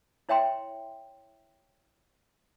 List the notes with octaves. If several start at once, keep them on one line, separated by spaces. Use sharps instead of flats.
E4 C#5 E5 G5 A#5 C6